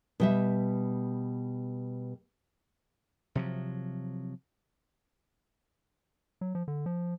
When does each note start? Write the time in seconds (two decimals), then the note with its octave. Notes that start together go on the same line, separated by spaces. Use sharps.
0.20 B2 G3 E5
3.35 C3 F3 F#3
6.41 F#3
6.55 F3
6.68 D3
6.86 F3